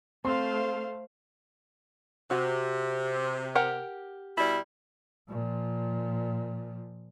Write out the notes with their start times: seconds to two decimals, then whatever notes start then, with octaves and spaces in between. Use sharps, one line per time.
0.25 A3 C4 C5 F5 C6
2.31 C3 F#4
3.55 G4 A#4 F#5
4.37 B2 G3 E4
5.28 A#2 F3